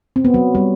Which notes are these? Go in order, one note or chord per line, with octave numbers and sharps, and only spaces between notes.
C4
B3
F#3
G3